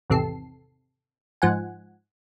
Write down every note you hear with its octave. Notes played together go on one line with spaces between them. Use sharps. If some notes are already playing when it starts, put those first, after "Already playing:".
G#1 E2 C3 A4 C7
G#2 F3 F#5 G#5